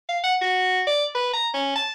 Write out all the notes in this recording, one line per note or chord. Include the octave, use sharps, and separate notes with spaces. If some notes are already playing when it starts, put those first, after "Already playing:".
F5
F#5
F#4
D5
B4
A#5
C#4
A5